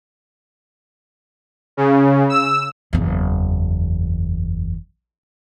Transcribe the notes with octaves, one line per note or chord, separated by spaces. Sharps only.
C#3
E6
F#1 E2